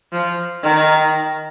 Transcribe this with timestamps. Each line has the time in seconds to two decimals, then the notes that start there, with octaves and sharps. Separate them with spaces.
0.13 F3
0.62 D#3